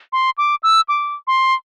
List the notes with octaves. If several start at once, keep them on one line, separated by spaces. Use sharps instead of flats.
C6
D6
E6
D6
C6